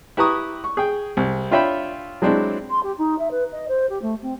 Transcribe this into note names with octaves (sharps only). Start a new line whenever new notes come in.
E4 G4 B4 A#5 C#6 D#6
C#6
G#4 G5
C2
D4 F4 C#5 E5 G5 B5
F#3 G#3 C4 D4 E4
C6
G4
D#4
E5
B4
D#5
C5
G4
A3
C4